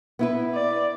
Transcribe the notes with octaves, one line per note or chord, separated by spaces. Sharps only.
B3 E4 B4
D5